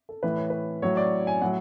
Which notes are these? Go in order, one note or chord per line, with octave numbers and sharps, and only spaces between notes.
A4
A2 E3 B4
C#5
B4
A2 F#3 C#5
D5
G#5
A2 F#3 F#5